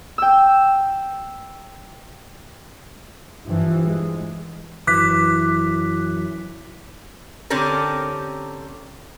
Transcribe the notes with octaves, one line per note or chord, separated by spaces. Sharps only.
G5 E6
G2 E3 F3
G#3
F#2 E3 D6 F#6 B6
D3 C4 C#4 G4 A4 A#4